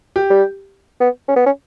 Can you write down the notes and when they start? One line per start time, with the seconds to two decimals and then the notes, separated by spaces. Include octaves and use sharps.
0.16 G4
0.30 G3
1.00 B3
1.28 C#4
1.36 B3
1.46 C#4